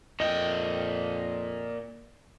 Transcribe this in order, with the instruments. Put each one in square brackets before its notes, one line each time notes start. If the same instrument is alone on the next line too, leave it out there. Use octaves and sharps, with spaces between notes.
[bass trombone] F2 [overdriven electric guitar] A#2 G5 [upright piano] D#5